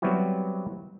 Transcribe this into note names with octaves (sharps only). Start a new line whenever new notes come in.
F#3 G3 B3 C4 E4 F#4